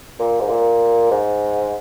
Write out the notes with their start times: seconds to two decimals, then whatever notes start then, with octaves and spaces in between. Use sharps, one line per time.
0.19 A#2
0.40 G#2
0.49 A#2
1.11 G#2